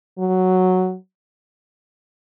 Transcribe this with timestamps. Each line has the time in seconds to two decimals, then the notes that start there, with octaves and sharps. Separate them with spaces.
0.19 F#3